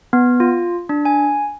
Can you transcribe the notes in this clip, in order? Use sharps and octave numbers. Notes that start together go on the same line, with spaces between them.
B3
F4
D4
G#5